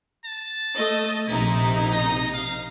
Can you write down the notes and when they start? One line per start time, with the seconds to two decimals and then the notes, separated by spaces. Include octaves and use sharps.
0.25 A5
0.77 A3 D#5
1.28 A#1 C3 D#4 E4
1.93 D#5
2.34 F5